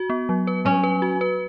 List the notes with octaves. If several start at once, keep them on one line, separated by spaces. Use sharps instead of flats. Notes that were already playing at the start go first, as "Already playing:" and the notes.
Already playing: F#4
B3
F#3
B4
F#3 C#4
B4
F#4
B4